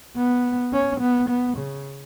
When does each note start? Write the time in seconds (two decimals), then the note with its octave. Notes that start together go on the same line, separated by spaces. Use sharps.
0.17 B3
0.73 C#4
1.01 B3
1.29 B3
1.58 C#3